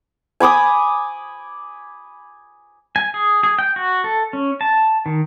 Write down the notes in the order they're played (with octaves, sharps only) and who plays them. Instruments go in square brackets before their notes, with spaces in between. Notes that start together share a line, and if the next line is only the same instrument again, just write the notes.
[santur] G#5 B5 D6 D#6
[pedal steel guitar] G#5
G#4
G#4
G5
F#4
A4
C#4
A5
D#3